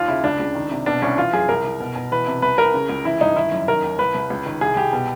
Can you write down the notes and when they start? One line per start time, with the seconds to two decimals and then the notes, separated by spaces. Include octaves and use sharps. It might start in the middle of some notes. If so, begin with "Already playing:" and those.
Already playing: D#2 F4
0.08 C#3 E4
0.24 C#2 D4
0.39 C#2
0.55 D#3
0.71 C3
0.86 B2 D4
1.02 C2 C#4
1.17 E3 F4
1.33 F#2 G#4
1.49 C2 A#4
1.64 C2
1.80 B2
1.96 B2
2.12 E3 B4
2.27 C3
2.42 C2 B4
2.58 C2 A#4
2.74 C#3
2.89 C#2
3.05 E3 E4
3.21 G2 D#4
3.36 D#3 E4
3.52 F#2
3.68 D#3 A#4
3.84 D#2
3.99 C2 B4
4.15 C2
4.30 C#2
4.46 D#3
4.61 C2 G#4
4.77 C2 G4
4.93 B2